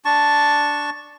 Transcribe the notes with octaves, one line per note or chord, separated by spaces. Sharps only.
D4 A5 C#6